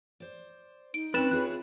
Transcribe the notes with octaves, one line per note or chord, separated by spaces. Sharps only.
C5 D5
D#4 D7
C4 C#4 B4 A6 E7
E4 F4 G#4 C#5 F#6